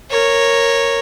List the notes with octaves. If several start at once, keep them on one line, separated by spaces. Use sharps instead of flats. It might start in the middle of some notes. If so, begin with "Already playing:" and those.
A#4 C#5